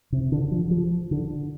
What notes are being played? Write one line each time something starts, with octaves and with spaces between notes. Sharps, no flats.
C3
D3
F3
F3
D3